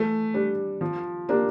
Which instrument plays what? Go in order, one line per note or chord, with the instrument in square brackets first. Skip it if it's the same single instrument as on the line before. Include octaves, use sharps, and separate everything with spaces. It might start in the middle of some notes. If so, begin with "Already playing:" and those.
Already playing: [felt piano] E3 [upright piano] A3
[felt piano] G3 D4
F3
A#3 D4 G4